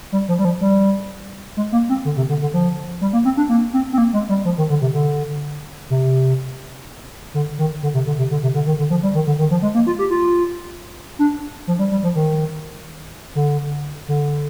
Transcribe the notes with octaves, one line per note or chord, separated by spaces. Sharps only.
G3
F3
G3
F3
G3
G#3
A#3
C4
D3
C3
D3
D3
F3
G3
A#3
C4
D4
A#3
C4
C4
A#3
G#3
G3
F3
D#3
D3
C3
D3
C3
D3
D#3
D3
C3
D3
C3
D3
C3
D3
D#3
D3
F3
G3
D#3
D3
D#3
F3
G#3
A#3
F4
G4
F4
D4
F3
G3
G3
F3
D#3
D3
D3